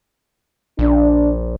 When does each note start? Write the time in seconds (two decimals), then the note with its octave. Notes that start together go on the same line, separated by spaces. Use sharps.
0.79 A#1 D4